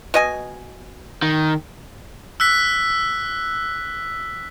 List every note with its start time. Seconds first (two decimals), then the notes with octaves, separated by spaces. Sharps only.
0.14 B2 D#5 G#5
1.22 D#3
2.40 E6 F#6 B6